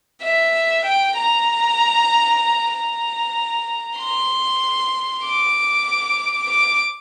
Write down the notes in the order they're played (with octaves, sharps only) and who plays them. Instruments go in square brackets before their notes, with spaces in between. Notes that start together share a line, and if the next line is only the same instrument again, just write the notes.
[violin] E5
G5
A#5
A#5
C6
D6
D6